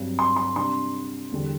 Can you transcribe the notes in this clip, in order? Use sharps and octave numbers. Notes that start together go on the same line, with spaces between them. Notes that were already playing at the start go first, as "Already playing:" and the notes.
Already playing: G2 F#3 C4
C6
C6
C3 G3 D4 C6
E2 D3 G3